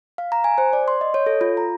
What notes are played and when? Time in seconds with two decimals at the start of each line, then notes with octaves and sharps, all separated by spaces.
0.18 F5
0.32 A#5
0.44 G#5
0.58 C5
0.73 D5
0.88 C6
1.01 D#5
1.14 C#5
1.26 A4
1.41 F4
1.57 A#5